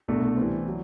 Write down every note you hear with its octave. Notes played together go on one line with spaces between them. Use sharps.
C2 B2 A3 D4
E3 G3 C4
F#3